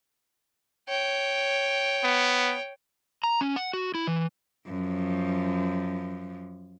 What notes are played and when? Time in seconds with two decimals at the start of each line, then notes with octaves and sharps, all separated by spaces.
0.88 C#5 G5
2.04 B3
3.23 A#5
3.41 C#4
3.56 F#5
3.73 F#4
3.94 E4
4.07 E3
4.67 F#2 F3